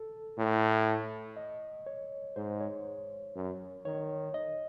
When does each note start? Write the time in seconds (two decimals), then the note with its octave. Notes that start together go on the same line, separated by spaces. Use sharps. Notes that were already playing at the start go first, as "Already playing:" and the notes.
Already playing: A4
0.38 A2
1.37 D#5
1.86 C#5
2.36 G#2 C5
2.61 C#5
3.36 F#2
3.85 D#3 C#5
4.34 D#5